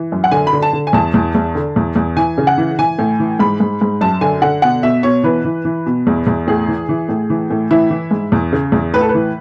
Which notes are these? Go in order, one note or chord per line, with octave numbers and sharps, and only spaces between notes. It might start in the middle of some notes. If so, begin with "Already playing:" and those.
Already playing: E3
F#2
F#5
D3 G#5
B5
D3
A5
D3
G#5
E2 A5
E2
E2
D3
E2
E2
E3 G#5
C#3
F#5
E3
E3 G#5
A2
E3
G#2 B5
G#2
G#2
F#2 A5
D3 G#5
D3 F#5
B2 F#5
B2 E5
B2 C#5
E3 B4
E3
E3
B2
E2
E2
A2 G#4
E3
E3
A2
E3
A2
E3 E4
E3
G#2
E2
C#3
E2
A2 B4
A4
B4
E3